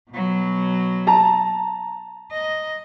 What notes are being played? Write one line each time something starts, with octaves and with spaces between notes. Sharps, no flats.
B2 F#3
A5 A#5
D#5